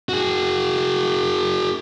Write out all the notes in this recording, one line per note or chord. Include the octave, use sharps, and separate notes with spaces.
F#4 G#4